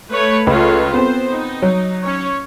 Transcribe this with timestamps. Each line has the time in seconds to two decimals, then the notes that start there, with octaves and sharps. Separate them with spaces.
0.12 A3 B4 C#5
0.47 C#2 F4 A4 B4 C#5
0.94 B3 C4 C5
1.29 D#4
1.62 F#3
2.05 C#4 C#5